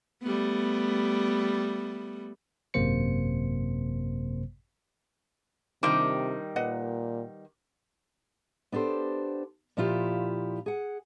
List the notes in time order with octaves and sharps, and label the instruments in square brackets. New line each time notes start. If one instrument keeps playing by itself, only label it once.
[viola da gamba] G3 A3 B3
[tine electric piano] G#1 F#2 C3 A#3 C5 C#7
[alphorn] C3 [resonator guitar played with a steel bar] D#3 G3 [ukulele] D4 F4 C5 [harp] D6
[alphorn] A#2 [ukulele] B4 D#5 F#5
[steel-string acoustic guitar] B3 D4 G4 A4 C5
A#2 F3 E4 F4 G4
G#4 F#5